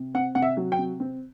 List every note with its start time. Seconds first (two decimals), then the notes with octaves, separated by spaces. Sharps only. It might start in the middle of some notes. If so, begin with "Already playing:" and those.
Already playing: C3
0.14 C4 F#5
0.35 C3 F#5
0.42 E5
0.57 F#3
0.72 G5
0.78 C3
1.00 C4